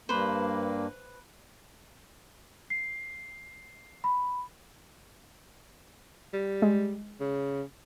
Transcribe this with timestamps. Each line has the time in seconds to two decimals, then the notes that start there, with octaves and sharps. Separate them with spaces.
0.09 G2 A#3 B4 C5
2.70 C7
4.04 B5
6.34 G3
6.62 G#3
7.20 C#3